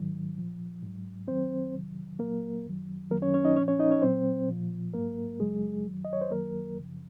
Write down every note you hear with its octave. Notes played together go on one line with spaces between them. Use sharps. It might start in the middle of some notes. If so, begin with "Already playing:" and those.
Already playing: G#2 D#3 F#3
A#2 F3
G#2 F#3
F#2 D#3 F#3 C4 C5
F2 C3 D#3 F#3
A#2 F#3 A#3 A#4
F#2 D#3 F#3
F#2 D#3 F#3 A#3 A#4
C#4 C#5
C#4 C#5
D#4 D#5
A#2 F3 C#4 C#5
C#4 C#5
D#4 D#5
C#4 C#5
A#2 F#3 C4 C5
A#2 F3
G#2 F#3 A#3 A#4
F#2 C#3 F#3 G#3 G#4
F#2 D#3 F#3
D#5
C#5
C5
F#2 D#3 F#3 A#3 A#4
F#2 C#3 F3